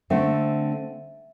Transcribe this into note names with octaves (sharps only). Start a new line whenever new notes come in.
D3 A3 C4 E5